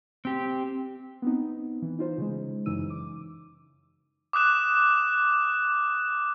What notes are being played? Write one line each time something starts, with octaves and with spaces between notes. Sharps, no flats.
C4 G4
B3 C4 D#4
E3
D#4 F4 C5
C#3 G#3
F#2 C#3 E3 D#4 E6 D#7
D6
D6 D#6 F#6 E7